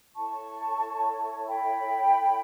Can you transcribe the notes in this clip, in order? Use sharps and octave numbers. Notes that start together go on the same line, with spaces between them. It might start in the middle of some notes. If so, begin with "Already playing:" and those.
E4 A4 C#5 A5 C#6
G5 B5